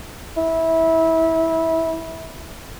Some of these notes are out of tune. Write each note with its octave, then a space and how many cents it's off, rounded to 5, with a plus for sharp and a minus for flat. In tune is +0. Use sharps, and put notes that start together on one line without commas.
E4 -20